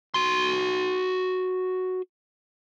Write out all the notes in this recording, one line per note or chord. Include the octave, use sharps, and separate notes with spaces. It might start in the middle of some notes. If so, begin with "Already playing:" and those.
F#4 C6